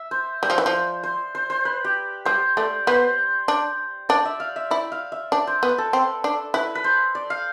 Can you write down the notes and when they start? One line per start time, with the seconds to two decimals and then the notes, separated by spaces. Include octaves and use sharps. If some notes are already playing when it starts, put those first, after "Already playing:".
Already playing: E5
0.11 C5
0.42 G3 D5
0.50 F3
0.58 E3
0.66 F3
0.73 C5
1.03 C5
1.35 C5
1.50 C5
1.65 B4
1.84 G4
2.25 G3 C5
2.57 A3 D5
2.87 B3 C5
3.48 D4
4.09 D4 D5
4.25 E5
4.40 F5
4.56 E5
4.71 E4 D5
4.92 F5
5.12 E5
5.32 D4 D5
5.47 C5
5.63 B3
5.69 B4
5.78 A4
5.93 C4
6.24 D4
6.54 E4 B4
6.75 B4
6.84 C5
7.15 D5
7.30 F5